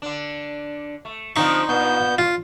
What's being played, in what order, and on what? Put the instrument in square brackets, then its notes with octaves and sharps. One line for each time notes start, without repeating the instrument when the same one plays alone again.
[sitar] D3 D4
A3
[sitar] D3 F3 C4 [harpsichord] D#4 C#6
[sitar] A#2 [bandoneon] B3 G6
[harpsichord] F4